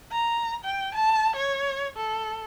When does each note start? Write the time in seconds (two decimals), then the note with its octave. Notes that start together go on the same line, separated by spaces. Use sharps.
0.12 A#5
0.64 G5
0.94 A5
1.35 C#5
1.96 A4